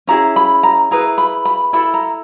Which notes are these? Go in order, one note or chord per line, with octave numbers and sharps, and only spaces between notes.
C#4 E4 G#4 A#5
B5
A#5
E4 G#4 B4 A#5
B5
B5
E4 A4 B5
A#5